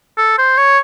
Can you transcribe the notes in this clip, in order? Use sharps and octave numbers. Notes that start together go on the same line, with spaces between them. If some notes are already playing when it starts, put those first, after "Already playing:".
A4
C5
C#5